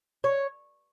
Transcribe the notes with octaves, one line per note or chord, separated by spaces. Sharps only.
C#5